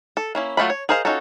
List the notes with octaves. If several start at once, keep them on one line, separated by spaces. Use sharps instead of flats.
A4
A#3 C#4 E4
F#3 A3 F4 B5
C#5
G#4 A#4 C5 D#5 F5
C#4 D#4 F4 F#4 A4